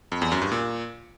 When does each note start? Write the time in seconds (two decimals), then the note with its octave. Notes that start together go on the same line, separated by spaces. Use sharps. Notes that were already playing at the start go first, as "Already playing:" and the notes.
0.12 F2
0.22 E2
0.32 F#2
0.42 G2
0.52 A#2